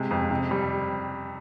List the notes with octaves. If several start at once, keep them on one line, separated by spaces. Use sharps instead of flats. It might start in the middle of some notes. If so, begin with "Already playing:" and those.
Already playing: C3 G#3
F2
C3
G3